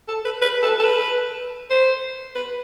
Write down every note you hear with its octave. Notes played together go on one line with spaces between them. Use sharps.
A4
B4
B4
A4
A4
B4
C5
B4